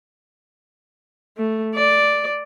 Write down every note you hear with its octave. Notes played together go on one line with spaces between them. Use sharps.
A3
D5